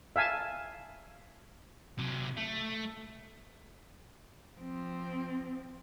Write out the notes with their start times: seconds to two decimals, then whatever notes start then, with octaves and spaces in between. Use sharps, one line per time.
0.16 E5 F5 G#5 A5
1.99 C3 F#3
2.37 A3
4.59 F3 C4